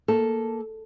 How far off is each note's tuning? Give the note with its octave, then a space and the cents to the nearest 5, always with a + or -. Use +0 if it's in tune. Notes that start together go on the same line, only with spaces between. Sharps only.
A#3 +0 A4 +0